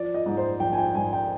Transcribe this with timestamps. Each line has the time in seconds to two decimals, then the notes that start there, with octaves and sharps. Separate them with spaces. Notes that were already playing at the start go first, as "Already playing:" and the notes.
Already playing: F3 D5
0.14 D#5
0.26 G#2
0.37 C5
0.60 A#1 G5
0.73 G#5
0.78 G5
0.95 G#2 G#5
1.13 G5